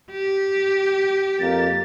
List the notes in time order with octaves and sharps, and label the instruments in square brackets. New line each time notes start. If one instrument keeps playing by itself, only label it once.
[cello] G4
[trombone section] F2 A#3 [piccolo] A6